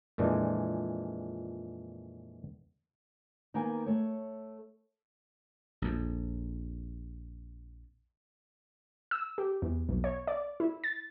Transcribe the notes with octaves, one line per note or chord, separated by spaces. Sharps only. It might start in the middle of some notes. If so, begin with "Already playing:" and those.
F2 A#2 E3 G#3 D4
D#3 A#3 B3 F5 G5 G#5
A3 C#5
A#1 F2
E6
G4
E2
B1
C#5
D5
E4
A6